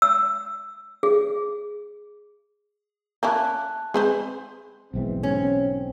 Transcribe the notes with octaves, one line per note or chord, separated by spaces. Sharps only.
E6
G#4
A#3 C#4 E4 A5 F#6
G#3 C4 B4 C5
B1 G#2 E3 C4
C#4